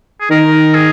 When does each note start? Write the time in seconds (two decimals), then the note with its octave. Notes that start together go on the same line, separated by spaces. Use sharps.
0.21 G#4
0.30 D#3 A#4
0.75 G#4